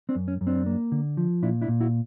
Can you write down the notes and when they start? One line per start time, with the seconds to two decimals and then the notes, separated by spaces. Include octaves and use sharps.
0.09 C4 D4
0.15 F#2
0.28 C#4
0.41 F#2
0.47 C4 D4
0.66 A#3
0.92 D3
1.17 F3
1.43 A#2 D4 E4
1.61 D4 E4
1.68 A#2
1.80 E4 F#4